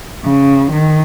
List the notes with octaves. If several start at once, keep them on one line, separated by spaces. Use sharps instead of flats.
C#3
D#3